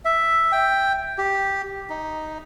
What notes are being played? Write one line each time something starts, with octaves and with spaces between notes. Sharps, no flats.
E5
G5
G4
D#4